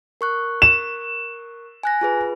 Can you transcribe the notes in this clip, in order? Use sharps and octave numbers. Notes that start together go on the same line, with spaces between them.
A#4 C#6 F#6
E7
G#5 F#6 A#6
F4 G#4 B4